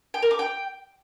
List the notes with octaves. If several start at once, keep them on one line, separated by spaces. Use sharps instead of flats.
G5
A#4
D6
G5